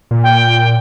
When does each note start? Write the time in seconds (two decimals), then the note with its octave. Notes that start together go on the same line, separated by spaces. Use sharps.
0.11 A#2
0.23 G5